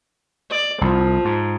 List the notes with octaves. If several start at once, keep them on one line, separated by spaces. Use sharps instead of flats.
D5
C2 F3
G#2